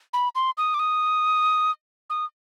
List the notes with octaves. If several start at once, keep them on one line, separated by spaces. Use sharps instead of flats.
B5
C6
D#6
D6
D#6
D#6